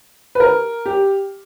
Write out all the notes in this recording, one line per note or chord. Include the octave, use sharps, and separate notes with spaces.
B4
A#4
G4